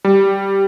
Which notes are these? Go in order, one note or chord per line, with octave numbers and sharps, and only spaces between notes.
G3